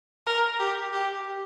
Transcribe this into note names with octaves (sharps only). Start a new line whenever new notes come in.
A#4
G4
G4